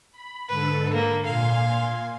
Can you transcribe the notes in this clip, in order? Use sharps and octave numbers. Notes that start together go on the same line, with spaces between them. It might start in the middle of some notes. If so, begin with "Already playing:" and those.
B5
G#2 D3 A4 B4
A#3
A#2 F5 G#5 C6